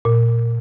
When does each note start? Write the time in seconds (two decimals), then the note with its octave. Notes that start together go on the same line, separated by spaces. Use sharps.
0.05 A#2